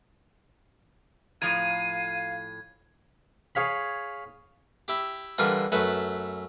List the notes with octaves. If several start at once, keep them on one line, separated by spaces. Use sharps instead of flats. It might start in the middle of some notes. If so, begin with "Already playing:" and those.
A2 F3 F5 A#5 G#6 D#7
G#4 C#5 F5 B5
E4 G4
D3 E3 G3 F4 A#4
F#2 A3 A4 B4